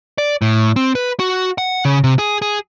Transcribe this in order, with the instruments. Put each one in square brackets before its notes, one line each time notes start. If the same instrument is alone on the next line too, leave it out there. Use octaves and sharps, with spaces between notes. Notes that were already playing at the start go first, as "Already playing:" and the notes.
[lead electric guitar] D5
A2
C4
B4
F#4
F#5
C#3
C3
G#4
G#4